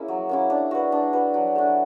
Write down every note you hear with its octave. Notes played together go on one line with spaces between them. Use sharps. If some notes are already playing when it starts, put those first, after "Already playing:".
Already playing: A#3 C#4 E4 G#4
F#3
A#3 C#4 E4
D4
F#4 B4
D4
F#4 B4
F#3
A3 D4